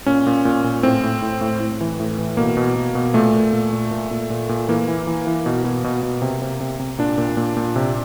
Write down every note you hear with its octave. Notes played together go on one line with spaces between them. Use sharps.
A#2 C#4
A#2
A#2
A#2
A2 C4
A2
A2
A2
A2
E3
A2
E3
B2 A#3
B2
B2
B2
A#2 A3
A#2
A#2
A#2
A#2
A#2
A#2
A#2
E3 A#3
E3
E3
E3
B2
B2
B2
B2
C3
C3
C3
C3
A#2 D4
A#2
A#2
A#2
C3